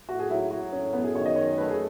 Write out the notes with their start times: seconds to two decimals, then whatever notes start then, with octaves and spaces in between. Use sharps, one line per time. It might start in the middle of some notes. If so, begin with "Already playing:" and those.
0.08 A2 F#4
0.19 G#4
0.29 F#3 E4
0.41 E4
0.51 F#3 F#4
0.72 A2 C#4
0.93 F#2 B3
1.04 G#4
1.15 D#3 C#5
1.26 D#5
1.36 F#2 C#5
1.58 A3 B4
1.70 G#4